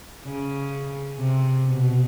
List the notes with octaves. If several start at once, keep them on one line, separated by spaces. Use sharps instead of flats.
C#3
C3
B2